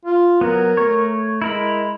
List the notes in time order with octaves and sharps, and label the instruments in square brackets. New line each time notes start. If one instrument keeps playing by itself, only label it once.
[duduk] F4
[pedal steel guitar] F#3 B3 [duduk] A#4
[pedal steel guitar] A3 C#5
[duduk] G#3 [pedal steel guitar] E4 A#4 B5